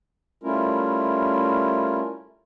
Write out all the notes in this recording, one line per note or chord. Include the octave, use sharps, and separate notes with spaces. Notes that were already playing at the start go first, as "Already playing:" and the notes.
G3 A3 C#4 E4 F4 A#4